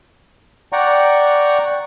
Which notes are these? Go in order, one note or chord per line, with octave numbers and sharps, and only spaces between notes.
D5 F#5 G5 A#5 C#6